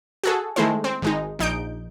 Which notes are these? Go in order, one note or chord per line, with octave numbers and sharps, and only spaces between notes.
F#4 G#4 A4
D#3 G#3 A3 E4 C5
C4
G#1 G#3 D#4
A#1 D#4 G6 D7